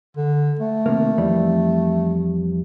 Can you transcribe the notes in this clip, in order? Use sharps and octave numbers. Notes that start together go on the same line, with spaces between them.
D3
A3
C3 D#3 A#3
F2 E3 G3